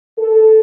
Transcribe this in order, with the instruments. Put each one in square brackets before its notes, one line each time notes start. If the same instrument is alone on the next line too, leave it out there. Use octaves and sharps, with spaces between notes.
[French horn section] A4